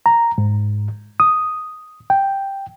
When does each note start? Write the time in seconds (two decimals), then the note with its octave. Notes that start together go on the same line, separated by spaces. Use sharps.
0.06 A#5
0.38 G#2
1.20 D#6
2.10 G5